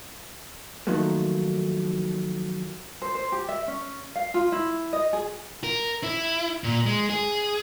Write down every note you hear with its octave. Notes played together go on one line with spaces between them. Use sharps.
D#3 F3 F#3 A3 A#3
C5
C5
G4
E5
C#4
F5
F4
E4
D#5
G#4
A#4
E4
A#2
G#3
G#4